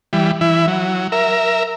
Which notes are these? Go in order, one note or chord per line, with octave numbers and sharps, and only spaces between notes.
E3 G3
E3 E4
F#3
A#4 E5